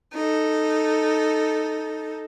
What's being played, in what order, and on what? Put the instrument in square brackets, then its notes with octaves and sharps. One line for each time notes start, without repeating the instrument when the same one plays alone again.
[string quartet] D#4 A4